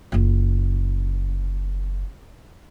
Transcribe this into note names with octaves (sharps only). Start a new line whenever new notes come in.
F#1 F4